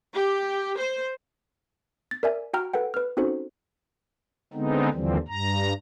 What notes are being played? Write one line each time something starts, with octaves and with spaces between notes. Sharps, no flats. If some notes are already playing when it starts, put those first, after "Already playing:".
G4
C5
A6
A#4 D5 E5 G#5
F#4 G5 A#5 F6
A4 B4 F#5 G5
B4 F6
C4 C#4 D#4 F#4 A4 C5
D3 G#3 B3 C4 D#4
D#2 D3 E3 F3 G3 C4
G2 A#5